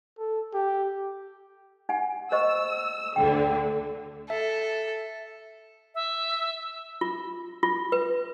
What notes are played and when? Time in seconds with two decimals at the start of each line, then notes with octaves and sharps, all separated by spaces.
0.19 A4
0.54 G4
1.89 D#4 F#5 G#5
2.32 C5 D#5 C#6 E6
3.16 D2 D3 G5
4.30 A4 E5
5.95 E5
7.01 F4
7.63 F4
7.92 B4